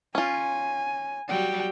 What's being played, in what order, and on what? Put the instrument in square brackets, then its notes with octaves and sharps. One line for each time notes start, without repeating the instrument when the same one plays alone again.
[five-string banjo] C#4 F4 [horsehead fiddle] G#5
[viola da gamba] F#3 G3 [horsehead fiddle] G5